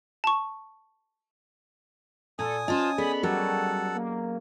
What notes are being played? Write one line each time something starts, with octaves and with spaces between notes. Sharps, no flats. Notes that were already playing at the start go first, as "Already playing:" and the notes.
A5 C#6
A#2 A4 G#5 D#6
C#4 F4 C5 D#5 A5
B3 G#4 A4 D5 B5
F#3 G3 B3 F#4 A4 A#4 F#5 A5
A#3